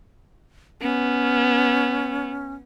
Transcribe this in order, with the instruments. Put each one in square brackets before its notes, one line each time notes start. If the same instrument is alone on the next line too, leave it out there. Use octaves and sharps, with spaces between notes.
[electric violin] B3 [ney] C#4